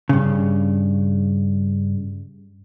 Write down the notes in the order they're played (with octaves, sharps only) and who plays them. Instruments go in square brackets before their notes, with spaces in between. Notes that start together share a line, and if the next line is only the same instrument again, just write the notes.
[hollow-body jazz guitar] G2 C#3